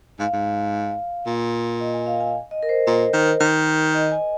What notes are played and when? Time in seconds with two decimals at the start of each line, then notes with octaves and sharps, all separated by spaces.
0.19 G#2 F5
0.33 G#2
1.27 A#2
1.80 D#5
1.94 G#5
2.07 F5
2.20 G#5
2.51 D#5
2.63 A#4
2.69 C5
2.87 A#2
3.13 D#3
3.41 D#3
3.94 D#5
4.12 G#5